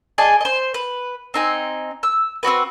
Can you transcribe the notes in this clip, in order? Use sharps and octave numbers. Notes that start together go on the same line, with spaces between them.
G#4 D5 D#5 A5
C5 D#5
B4
C4 D#4 G#5
E6
C4 D#4 F#4 B4